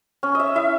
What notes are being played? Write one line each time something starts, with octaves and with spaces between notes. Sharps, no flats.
C#4
D#5 E5
E4 E5